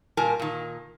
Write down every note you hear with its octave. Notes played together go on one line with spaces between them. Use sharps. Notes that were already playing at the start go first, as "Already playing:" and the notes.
A#2 G3 F4 A#4 G#5 A5
A#2 D#3